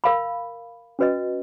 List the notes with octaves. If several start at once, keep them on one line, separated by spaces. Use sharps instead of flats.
A#4 F5 B5
C#4 F#4 B4 D#5